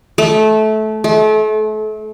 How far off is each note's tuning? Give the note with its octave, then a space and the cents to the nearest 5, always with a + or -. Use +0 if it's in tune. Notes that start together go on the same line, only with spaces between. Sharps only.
A3 -20
A3 -35